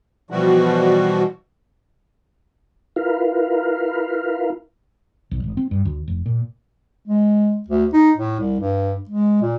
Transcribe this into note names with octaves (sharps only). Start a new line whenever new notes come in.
B2 E3 F3 G3 F#4
E4 F4 A#4 B4 F5
B1
G#1
C4
G2
D2
F1
A#2
G#3
D2
D#4
A2
C2
G2
G#3
A#2